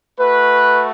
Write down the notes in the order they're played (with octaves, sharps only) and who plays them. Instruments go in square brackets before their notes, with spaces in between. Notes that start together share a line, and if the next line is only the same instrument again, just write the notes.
[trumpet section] A3 F#4 B4